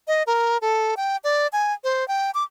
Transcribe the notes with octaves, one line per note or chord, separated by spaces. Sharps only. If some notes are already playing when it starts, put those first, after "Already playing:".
D#5
A#4
A4
G5
D5
G#5
C5
G5
D6